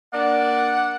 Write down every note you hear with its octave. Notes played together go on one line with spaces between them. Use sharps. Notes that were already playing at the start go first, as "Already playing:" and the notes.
A#3 D4 D5 F#5